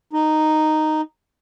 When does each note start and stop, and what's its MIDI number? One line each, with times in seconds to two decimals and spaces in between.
0.13 1.01 63